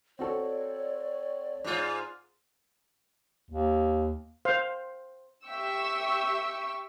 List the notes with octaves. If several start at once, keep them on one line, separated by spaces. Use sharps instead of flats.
C4 F#4 A4 C#5 D5
G#2 F4
D#2
C5 F5
G4 E5 G5 C#6 E6